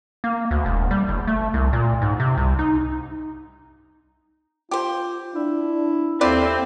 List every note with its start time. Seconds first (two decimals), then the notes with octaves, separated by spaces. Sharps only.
0.24 A#3
0.51 D2
0.65 E1
0.91 G3
1.08 F#1
1.27 A3
1.54 C2
1.73 A#2
2.01 G#2
2.20 C3
2.37 C2
2.59 D#4
4.71 F4 G4 C5
5.35 D4 E4
6.21 D#2 C4 E4 F4 A4 D5